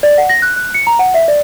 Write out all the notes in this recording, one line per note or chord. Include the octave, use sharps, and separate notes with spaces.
D5
F#5
A#6
F#6
F#6
C#7
A#5
F#5
E5
D5